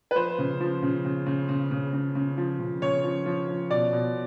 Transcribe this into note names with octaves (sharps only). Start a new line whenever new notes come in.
B4
F3 C5
C#3
F3
C#3
C#3
C#3
C#3
C#3
C#3
C#3
F3
C#3
C#3 C#5
F3
F3
F3
B2 D5
B2